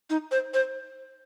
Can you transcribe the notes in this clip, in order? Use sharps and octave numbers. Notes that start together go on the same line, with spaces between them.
D#4
C5
C5